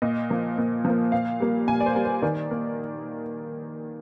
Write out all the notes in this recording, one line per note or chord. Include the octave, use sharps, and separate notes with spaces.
A#2 D#5
F3 A#3
A#2
F3
A#3
A#2 F5
G3 A#3
A#2 G#5
D5
C5
G3 A#3
C5
D#3 D5
A#3